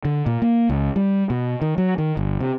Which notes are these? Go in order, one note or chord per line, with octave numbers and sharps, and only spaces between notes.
D3
A#2
A#3
C#2
G3
B2
D#3
F#3
D#3
G1
C3